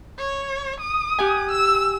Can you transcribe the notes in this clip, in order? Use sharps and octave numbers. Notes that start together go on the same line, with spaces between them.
C#5
D#6
G4 F#5 G#5
E6